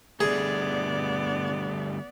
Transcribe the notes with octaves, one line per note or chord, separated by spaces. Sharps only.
D3 G3 A3 B3 G#4 D5